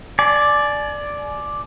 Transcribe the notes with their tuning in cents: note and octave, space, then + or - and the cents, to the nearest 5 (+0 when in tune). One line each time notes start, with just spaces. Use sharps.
D5 +0 G#5 +40